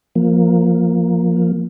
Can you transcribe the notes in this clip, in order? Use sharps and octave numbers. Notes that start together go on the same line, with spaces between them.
F3 A#3